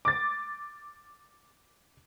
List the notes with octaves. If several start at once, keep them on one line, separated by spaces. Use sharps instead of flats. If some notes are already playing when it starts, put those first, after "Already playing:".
D6 A6